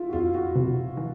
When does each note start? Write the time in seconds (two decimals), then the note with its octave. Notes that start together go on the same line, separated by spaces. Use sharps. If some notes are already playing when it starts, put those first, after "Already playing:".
Already playing: E4 F4
0.09 F#4
0.13 F2 F4
0.34 F#4
0.56 C3
0.97 E3